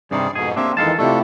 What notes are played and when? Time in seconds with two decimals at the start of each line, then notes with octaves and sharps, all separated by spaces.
0.11 G2 C3 D#3 G3 G#4 D5
0.35 F2 G#2 B2 G#4
0.56 A#3 C4 D4 G4 E5
0.77 F2 D#3 E3 G#3 D#4 A4 F5 A5
0.99 C3 A3 D4 E4 F4 G4 A4